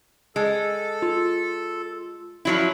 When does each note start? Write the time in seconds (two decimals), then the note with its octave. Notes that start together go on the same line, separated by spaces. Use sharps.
0.36 G#3 A4
1.02 F4
2.45 F3 F#3 E4